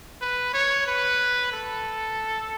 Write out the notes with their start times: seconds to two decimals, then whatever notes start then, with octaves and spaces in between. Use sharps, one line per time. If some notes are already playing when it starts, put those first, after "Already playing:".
0.21 B4
0.54 C#5
0.87 B4
1.52 A4